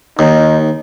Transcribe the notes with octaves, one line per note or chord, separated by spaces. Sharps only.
D#2 D#4